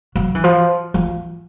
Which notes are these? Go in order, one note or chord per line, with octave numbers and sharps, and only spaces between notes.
F#3
E3
F3
F3